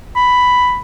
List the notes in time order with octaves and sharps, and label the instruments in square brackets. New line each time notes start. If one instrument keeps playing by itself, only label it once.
[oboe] B5